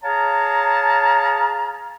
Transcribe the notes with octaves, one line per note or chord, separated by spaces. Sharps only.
G#4 C#5 F5 A5 A#5